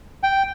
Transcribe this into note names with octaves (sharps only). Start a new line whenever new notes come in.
G5